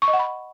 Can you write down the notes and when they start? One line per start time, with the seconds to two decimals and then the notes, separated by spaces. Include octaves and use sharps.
0.02 C#6
0.08 D#5
0.13 F#5
0.19 B5